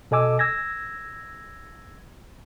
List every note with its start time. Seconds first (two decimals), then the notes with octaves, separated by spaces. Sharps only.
0.11 B2 A4 D#5 G#5 D6 E6
0.39 E6 G#6 A#6